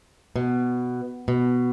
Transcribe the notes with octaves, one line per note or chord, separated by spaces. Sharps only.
B2
B2